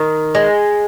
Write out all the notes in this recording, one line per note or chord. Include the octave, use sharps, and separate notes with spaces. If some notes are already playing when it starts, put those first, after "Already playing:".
Already playing: D#3
G#3